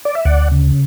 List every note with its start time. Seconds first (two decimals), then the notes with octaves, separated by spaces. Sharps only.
0.05 D5
0.15 E5
0.25 D2 D5 F#5
0.51 C#3